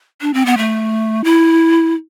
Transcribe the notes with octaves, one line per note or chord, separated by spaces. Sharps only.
D4
C4
B3
A3
E4